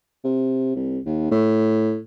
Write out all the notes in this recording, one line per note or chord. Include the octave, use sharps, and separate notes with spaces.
C3
C2
D#2
A2